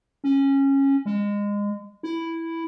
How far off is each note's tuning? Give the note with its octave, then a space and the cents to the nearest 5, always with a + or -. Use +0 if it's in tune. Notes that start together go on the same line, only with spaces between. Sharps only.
C#4 -15
G#3 -25
E4 +0